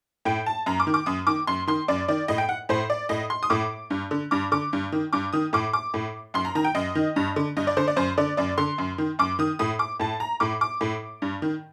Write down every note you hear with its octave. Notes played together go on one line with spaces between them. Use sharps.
A2 G5
A5
F#2 A#5
D6
D#3
D6
F#2 D#6
D#3 D6
F#2 C6
D#3 C6
F#2 D5
D#3 D5
A2 D#5
G5
F#5
A2 C5
D5
A2 D#5
C6
D#6
A2 D6
G2
D3
G2 D6
D3 D6
G2
D#3
G2 D6
D#3 D#6
A2 D6
D6
A2
F#2 C6
A#5
D#3 A#5
G5
F#2 D#5
D#3
G2
D3
G2 D#5
D5
D3 C5
D5
F#2 C5
D3 D5
F#2 D5
D3 C6
F#2
D#3
F#2 D6
D#3 D#6
A2 D#6
D6
A2 A5
A#5
A2 D6
D6
A2
G2
D#3